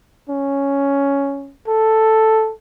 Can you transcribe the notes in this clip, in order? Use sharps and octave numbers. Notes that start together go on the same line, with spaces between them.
C#4
A4